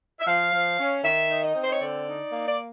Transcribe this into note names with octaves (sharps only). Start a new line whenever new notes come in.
E5
F3 F5
F3
C#4
D#3 E5
D#4
D#5
C4
C5
C#5
D3 D5
D#4
A#3
D5